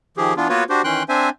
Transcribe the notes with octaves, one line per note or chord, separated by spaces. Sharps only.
D#3 F3 G4 G#4
E3 B3 D4 F4
A#3 B3 F4 F#4 B4 C#5
D4 F#4 G4 C5
D#3 E3 C#4 G5 C6 F#6
C4 D4 C5 E5 G#5